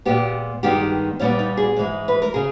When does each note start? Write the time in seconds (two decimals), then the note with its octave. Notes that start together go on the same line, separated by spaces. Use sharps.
0.05 A#2 G#3 B3 G4
0.63 G2 D#3 G#3 B3 G4
1.20 A#2 G3 B3 C#4
1.39 D#4
1.57 G#4
1.77 G#2 E3 G#3
2.08 B4
2.22 A#4
2.34 C#3 G#4